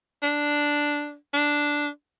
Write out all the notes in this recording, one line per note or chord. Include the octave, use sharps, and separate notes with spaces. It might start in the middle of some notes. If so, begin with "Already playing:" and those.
D4
D4